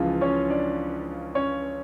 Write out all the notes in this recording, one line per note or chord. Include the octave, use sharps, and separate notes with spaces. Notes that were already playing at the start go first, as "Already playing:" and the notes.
Already playing: C#2 C#3 E3 F3 F4
C#4 C#5
D4 D5
C#4 C#5